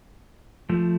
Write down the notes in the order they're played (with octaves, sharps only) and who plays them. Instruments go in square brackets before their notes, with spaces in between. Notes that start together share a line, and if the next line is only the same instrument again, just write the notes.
[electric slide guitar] F3 A3